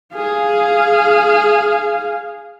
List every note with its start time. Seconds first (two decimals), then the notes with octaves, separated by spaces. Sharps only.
0.15 G#4 F5